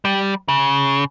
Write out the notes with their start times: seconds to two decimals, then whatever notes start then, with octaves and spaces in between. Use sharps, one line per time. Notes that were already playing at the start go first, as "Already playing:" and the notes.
0.05 G3
0.48 C#3